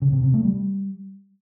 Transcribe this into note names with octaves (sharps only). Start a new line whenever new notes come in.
C#3
C3
C3
A3
G3